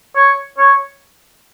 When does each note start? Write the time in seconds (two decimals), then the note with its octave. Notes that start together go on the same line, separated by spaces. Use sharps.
0.16 C#5
0.58 C#5